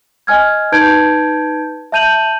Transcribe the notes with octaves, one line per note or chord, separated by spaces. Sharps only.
D#5 G#5 F6 G#6
D#4 B4 A5 G6 G#6 D7
E5 A5 G6 D#7 F7 F#7